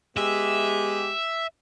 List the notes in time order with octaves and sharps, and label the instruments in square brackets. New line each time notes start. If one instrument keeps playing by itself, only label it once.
[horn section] G#3 B3 G4 [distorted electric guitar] E5